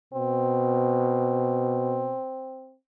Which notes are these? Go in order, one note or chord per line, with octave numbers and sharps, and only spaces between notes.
B2 C4